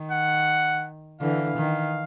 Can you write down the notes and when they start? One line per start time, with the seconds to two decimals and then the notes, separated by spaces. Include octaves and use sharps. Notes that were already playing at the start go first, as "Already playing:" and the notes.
Already playing: D#3
0.12 F#5
1.21 D3 E3 F5
1.58 D#3